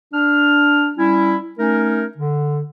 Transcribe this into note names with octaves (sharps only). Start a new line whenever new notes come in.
D4 F6
G3 C#4 E4
A3 C#4 D#4 A#4
D3